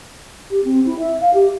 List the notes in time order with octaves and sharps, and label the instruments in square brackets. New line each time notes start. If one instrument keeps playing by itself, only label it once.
[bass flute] G4
C4
E4
E5
F5
G4